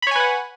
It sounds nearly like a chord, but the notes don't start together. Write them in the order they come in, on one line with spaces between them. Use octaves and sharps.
B5 C#5 G#5 B4 F#5